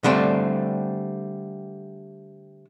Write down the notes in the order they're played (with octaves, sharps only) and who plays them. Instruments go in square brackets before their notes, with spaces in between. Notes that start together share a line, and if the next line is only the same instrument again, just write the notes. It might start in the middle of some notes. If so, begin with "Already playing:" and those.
[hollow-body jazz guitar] D3 G3 A3 C4